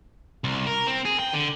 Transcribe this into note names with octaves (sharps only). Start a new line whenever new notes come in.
C2
A#4
C4
G#4
G5
D3